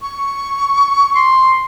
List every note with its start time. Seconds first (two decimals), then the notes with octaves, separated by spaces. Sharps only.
0.02 C#6
1.16 C6